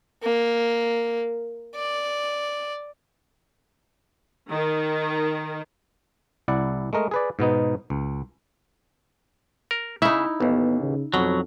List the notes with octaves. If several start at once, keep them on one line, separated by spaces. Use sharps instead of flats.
A#3
D5
D#3
C2 E4 D5 F#5
G#3 A3 A#4 D#5
G#4 B4 D5
G#2 B2 B3 D#4
C#2
A#4
C#3 D#4 E4 E5
A1 D#2 B3
C#3
F2 B2 F#3